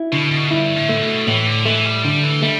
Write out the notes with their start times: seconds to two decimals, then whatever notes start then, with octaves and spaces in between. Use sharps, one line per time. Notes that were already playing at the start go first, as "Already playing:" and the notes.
Already playing: E4
0.12 B2 D3
0.31 B2
0.50 G2 E4
0.76 A2
0.89 A3
1.02 B2
1.27 A2 E3
1.47 D3
1.65 E3 A3
1.85 G3
2.04 D3 G3
2.23 E3
2.42 G3 A3